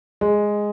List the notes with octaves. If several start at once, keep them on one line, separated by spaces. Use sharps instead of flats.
G#3